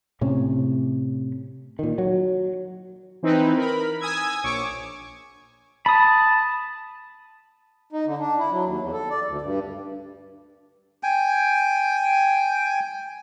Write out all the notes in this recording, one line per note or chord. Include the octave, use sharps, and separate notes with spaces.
A2 C3 C#4
A#2 D#3
F#3
E3 C4 D#4 E4 B4
A#4 B5
G#5 D#6 E6 G#6
A#1 C#5 C#6 D6
A5 B5 D#6
D#4
D3
D4
E4
F#3
D#2
E2
A4
D5
D2
G2
G5 G#5